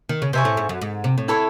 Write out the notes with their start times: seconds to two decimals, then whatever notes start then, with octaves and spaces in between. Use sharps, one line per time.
0.09 D#3
0.22 C#3
0.33 C3 C5 E5 G#5 C#6
0.45 A2
0.57 G#2
0.69 F#2
0.81 G#2
1.04 C3
1.18 A2
1.28 E4 A4 C#5